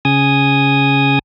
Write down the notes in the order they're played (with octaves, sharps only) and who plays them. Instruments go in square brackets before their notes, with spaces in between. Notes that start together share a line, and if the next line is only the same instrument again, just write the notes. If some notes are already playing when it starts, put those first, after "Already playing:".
[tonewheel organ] C#3 G#5 D#6